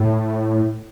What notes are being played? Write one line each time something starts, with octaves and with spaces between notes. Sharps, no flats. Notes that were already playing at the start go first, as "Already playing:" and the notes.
Already playing: A2